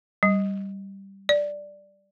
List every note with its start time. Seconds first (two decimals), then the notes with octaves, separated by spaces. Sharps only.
0.23 G3
1.29 D5